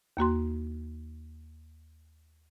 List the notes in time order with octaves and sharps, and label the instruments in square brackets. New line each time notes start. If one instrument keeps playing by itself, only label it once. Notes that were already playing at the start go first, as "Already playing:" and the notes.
[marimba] D#2 A#3 F#4 C6